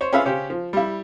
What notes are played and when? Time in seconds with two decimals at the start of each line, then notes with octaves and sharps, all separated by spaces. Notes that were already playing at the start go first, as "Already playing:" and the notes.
0.01 C5 C#5
0.13 C#4 F4 G#4 B4 E5 F5
0.25 C#3 C#4 G4 C5
0.50 F3
0.73 G3 E4